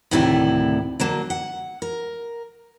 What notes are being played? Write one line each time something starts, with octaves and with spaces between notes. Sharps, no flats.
D2 A2 C3 D#3 E4 D5
D3 F#3 A#3
F#5
A#4